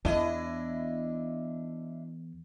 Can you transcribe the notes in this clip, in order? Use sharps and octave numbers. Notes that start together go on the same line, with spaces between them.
E2 D4 E4 D#5